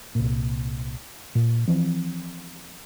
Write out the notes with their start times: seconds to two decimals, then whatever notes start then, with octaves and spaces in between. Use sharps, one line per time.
0.15 C2 A#2
1.35 A#2
1.68 E3 F3 C4